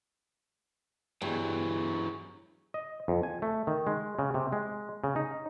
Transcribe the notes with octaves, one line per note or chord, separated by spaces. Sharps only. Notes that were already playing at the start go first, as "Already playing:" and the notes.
G2 E3 F#3 B3 G#4 D#5
D#5
F2
G#5
A3
D#3
G#3
C#3
C3
G#3
C#3
D#4